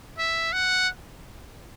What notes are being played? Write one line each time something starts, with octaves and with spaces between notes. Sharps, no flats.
E5
F#5